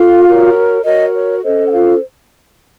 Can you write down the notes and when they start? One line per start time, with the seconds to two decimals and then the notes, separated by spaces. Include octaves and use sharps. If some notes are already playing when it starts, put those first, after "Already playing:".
Already playing: F4 A4 F5
0.25 F#4 A#4 C#5
0.84 F#4 A#4 C#5 D#5
1.13 C#5
1.43 C#4 A4 C5 D#5
1.68 F#5
1.72 F4 F5